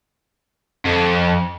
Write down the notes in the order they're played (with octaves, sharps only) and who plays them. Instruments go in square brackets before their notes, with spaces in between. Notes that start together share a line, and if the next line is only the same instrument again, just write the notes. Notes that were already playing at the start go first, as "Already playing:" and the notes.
[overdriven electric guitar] F2